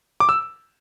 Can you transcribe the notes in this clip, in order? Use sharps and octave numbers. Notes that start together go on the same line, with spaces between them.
D6
E6